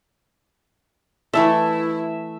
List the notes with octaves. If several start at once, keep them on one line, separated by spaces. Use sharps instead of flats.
E3 A3 E4 A4 E5